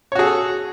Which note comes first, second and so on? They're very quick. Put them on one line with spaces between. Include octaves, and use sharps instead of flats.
C#5 F#4 G#4 A4